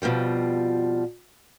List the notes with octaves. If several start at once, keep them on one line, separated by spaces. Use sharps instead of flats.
F2 B2 E3 F3 G3